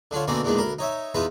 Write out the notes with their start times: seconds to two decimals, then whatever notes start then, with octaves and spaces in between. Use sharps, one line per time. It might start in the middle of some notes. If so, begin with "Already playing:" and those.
0.11 D3 D4 F4 C#5
0.28 B2 D3 A#3 C4 C#4 D5
0.43 E2 A#2 D#3 G#3 D4
0.58 D2 A#4 B5
0.79 D#4 C#5 E5
1.14 E2 D#4 F4 B4 E5